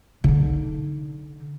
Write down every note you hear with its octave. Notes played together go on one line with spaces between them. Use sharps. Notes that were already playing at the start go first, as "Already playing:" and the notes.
D3 D#4